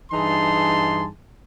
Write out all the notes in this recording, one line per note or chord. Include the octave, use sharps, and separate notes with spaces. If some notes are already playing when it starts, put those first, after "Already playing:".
G2 E3 D#4 G#4 A5 C6